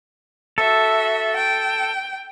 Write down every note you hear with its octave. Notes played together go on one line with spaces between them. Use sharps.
F#4 A4 E5
G5